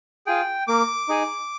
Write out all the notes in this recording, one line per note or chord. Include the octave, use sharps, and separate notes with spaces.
F4 G#4 G5
A#3 D6
D#4 G#4